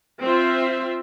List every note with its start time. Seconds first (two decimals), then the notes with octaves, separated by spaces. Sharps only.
0.22 C4 F4 C5 E5